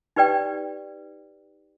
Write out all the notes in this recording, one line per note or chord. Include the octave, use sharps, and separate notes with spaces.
D#4 G4 B4 D5 G5